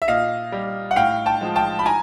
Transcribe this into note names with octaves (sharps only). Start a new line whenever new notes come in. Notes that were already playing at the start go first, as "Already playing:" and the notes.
E5
A#2 D#5 F5
G3
F#5
A2 F5 G5
G5 A5
F3 G#3
G5 A5
B5
G#5 A#5